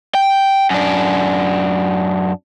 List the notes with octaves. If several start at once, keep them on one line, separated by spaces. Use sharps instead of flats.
G5
F#2 D4